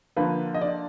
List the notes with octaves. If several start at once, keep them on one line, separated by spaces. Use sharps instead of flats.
D3 F3 A#3 B4
D#5
D5